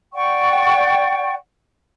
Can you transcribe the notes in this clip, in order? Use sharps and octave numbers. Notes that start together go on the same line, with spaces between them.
D5 F#5 G5 C#6